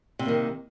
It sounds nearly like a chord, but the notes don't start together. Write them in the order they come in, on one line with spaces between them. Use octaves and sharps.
C3 G3 A#3 D#3